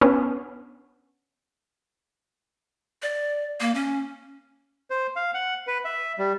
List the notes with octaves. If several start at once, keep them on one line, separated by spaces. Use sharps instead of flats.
B3 C#4 D4
D5
A#3
C#4
C5
F5
F#5
B4
E5
G3